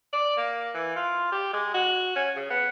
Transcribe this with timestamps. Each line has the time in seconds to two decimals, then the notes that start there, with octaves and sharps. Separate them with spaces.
0.13 D5
0.37 A#3
0.74 E3
0.96 F4
1.32 G4
1.53 G#3
1.74 F#4
2.16 C#4
2.36 C#3
2.50 B3